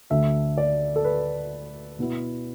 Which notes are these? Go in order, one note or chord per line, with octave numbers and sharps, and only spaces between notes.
D2 D3 A3 E5
D5
A4
B4
B2 B3 E4